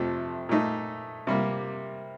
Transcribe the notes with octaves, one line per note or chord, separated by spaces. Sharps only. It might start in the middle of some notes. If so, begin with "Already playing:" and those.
Already playing: F2 C3 F3 A3
A#2 A3 D#4
C3 G3 A#3